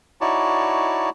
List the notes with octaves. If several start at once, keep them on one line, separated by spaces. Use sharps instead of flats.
D#4 E4 F#4 C#5 D5 A5